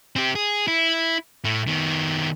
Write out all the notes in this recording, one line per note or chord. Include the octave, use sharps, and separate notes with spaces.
C4 G4
G#4
E4
A2 A3
D#3 B3